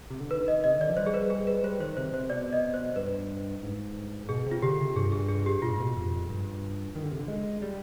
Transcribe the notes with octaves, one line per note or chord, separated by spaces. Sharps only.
C3
D3
D#3 B4
D#5
C3 D#5
D3
D#3 D5
F3
G3 C5
G#4
B4
G#4
B4
G3 C5
D#3 C5
C3 C5
C3 C5
B2 D5
D#5
C5
G2 B4
G#2
B2 G#4
C3
F4
D3 G4
C3
G2 G#4
G#4
G#4
G4
B2 F4
G#2
B2
F2
G2
D#3
D3
C3
D3
G#3
G3